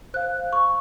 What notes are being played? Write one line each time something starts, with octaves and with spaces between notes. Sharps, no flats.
C5 F5 F#6
C#6